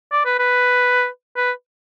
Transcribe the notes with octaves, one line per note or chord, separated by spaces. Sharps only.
D5
B4
B4
B4